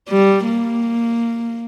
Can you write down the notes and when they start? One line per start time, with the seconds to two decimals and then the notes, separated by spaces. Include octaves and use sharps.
0.09 G3
0.45 A#3